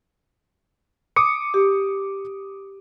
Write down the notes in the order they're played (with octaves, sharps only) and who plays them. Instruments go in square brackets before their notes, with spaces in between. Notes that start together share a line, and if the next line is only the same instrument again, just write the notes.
[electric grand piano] D6 D#6 C#7
[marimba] G4